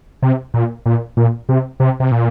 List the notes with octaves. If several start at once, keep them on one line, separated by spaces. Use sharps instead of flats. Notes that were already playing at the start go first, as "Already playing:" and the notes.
C3
A#2
A#2
A#2
C3
C3
C3
A#2